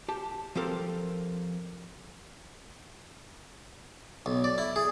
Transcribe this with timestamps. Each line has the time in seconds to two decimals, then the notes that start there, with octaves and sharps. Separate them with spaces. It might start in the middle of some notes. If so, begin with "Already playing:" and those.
0.08 G4 A5
0.56 F3 C4 G4 A4 A#4
4.26 B1
4.44 D5
4.58 E4
4.76 G#4